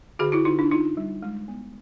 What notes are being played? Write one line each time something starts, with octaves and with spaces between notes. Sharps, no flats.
D3 F#4 G#4
E4 F#4
D3 D#4 F4
D4 E4
D4 D#4 F4
G3
G#3
B3